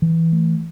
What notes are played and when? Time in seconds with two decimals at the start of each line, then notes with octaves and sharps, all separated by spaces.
0.02 E3
0.32 A3